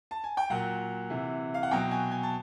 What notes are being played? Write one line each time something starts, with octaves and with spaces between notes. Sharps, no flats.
A5
G#5
G5
A#2 F#3 F#5
C3 E3
F5
F#5
B2 F#3 G5
G#5
G#5
A5